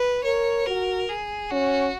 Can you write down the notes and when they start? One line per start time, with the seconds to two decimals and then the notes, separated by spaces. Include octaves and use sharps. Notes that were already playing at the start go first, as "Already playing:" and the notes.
Already playing: B4
0.24 A#4 C#5
0.67 F#4 A#4
1.09 G#4
1.51 C#4 F#4